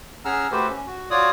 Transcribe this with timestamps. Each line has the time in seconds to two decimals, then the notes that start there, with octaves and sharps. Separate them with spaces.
0.25 C#4 G#4 F#5 A#5 E6 F6
0.52 A3 F#4 G4 A4 B4 C5
0.70 C#4
0.87 F#4
1.11 F4 F#4 C#5 D5 D#6